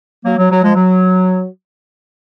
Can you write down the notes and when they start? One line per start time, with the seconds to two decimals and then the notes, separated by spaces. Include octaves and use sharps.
0.25 F#3 A#3
0.38 F#3
0.51 F#3
0.62 F3 G#3
0.75 F#3